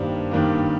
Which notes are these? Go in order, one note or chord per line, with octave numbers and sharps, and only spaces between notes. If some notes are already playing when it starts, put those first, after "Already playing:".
Already playing: G2 D#3 G3 A#3 C5
G2 D#3 G3 A#3